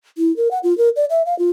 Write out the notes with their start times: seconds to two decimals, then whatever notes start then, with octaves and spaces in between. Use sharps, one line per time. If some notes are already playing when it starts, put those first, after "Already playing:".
0.18 E4
0.37 A#4
0.51 F#5
0.63 F4
0.78 A#4
0.96 D5
1.10 E5
1.26 F5
1.39 F4